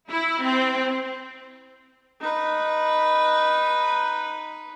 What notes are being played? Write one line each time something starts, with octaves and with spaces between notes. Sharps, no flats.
E4
C4
D#4 B4